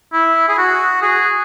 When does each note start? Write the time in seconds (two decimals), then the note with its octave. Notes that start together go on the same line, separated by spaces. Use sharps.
0.13 E4
0.49 G#4
0.58 F#4
1.02 G#4